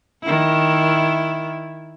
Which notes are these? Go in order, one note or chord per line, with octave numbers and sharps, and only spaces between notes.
D#3 E4